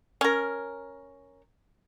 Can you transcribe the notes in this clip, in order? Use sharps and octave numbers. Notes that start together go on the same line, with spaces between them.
C#4 A#4